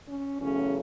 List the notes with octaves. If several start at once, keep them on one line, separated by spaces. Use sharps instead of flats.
C#4
E2 C#3 F#3 A3 C#4